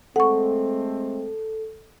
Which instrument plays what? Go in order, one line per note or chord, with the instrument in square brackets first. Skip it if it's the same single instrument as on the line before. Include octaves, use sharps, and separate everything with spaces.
[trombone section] G#3 A3 C4 [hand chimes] A4 [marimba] F#5 C#6